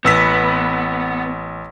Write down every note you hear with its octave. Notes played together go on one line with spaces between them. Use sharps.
A1 B3 E6 B6